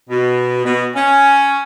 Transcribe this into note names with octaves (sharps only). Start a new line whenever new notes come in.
B2
B2
C#4